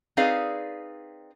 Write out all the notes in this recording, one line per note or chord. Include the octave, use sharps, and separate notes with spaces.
C4 D#4 G#4 B4 D5 F5